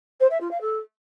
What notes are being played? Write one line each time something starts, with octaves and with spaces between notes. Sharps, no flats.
C5
E5
F4
F5
A4